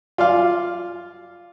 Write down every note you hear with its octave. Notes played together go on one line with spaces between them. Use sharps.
F4 D5 F5